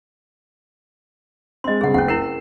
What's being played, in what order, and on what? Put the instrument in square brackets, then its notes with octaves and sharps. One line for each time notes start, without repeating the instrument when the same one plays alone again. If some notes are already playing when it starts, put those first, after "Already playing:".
[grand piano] G#3 C4 [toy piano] D#5 C6
[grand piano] G2 C#3 C4 [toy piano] G#4 F#5
[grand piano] F#1 [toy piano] C#4 F#5
[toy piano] E4 A#4 [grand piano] C7 E7